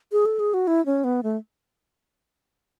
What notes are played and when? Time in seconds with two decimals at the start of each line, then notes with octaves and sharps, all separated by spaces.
0.12 G#4
0.26 A4
0.39 G#4
0.54 F#4
0.67 E4
0.86 C#4
1.04 B3
1.23 A3